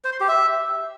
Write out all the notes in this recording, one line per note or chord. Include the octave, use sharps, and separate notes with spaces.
C5
C6
G4
E5